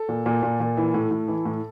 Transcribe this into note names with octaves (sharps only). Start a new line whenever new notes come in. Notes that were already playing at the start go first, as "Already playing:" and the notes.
Already playing: A4
A#2
A#2
A#2
A#2
E3
A2
A2
E3
A2